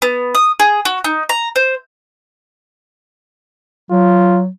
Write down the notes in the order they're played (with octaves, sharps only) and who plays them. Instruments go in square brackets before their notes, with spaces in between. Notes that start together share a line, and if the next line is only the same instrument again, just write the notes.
[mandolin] B3
D#6
G#4
F#4
D#4
A#5
C5
[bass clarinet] F#3 [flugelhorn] F4